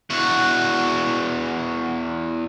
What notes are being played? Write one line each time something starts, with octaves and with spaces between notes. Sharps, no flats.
E2 F#4